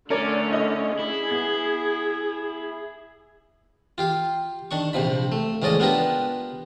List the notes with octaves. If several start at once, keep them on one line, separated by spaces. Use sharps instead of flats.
D3 A3 C#4 A#4 C#5 D5
E4 D#5
E4 G#4
B3 G#6
F4 G4 F5
D#3 D4 C#6
A#1 C3 F3 B5
A3
C#2 A2 F3 C#4 D5 D#5
B3 D4 F4 G4 A#4 B4